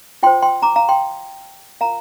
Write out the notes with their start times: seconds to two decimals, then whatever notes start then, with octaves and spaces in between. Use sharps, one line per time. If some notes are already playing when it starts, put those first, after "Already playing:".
0.23 F4 C5 G5 C6
0.42 G5 C6
0.62 A#5 D6
0.76 F5 A#5
0.89 G5 C6
1.81 F4 A#4 F5 A#5